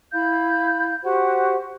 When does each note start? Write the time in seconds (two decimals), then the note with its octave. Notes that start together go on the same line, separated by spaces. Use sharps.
0.13 E4 F5 B5 G6
1.03 F#4 G4 C5 F#5